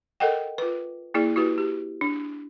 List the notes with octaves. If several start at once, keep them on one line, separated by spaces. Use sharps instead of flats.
A4 A#4 D#5 F#5 G5
F4 B4
A#3 E4 G#4 D5
E4 F#4 G4 B4
G4
D4